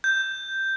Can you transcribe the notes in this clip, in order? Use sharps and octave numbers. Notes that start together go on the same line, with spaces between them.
G6